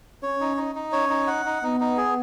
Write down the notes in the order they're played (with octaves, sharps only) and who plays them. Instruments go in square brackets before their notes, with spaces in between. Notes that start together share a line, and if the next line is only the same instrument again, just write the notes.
[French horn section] C#4 [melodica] C#5
[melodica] D#4
D#4
D#4
[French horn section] C#4 [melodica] C#5
[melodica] D#4
F#5
D#4
[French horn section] B3 [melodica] D#4
[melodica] D#4
G#4